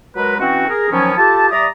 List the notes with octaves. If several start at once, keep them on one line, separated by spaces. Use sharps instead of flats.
F#3 G#3 A#4 B4
E3 C4 C#4 F#4
G#4 A#4
D#3 F3 F#3 B3 C#4
F4 G4 A4 A5
G3 D5 E5 A#5 D#6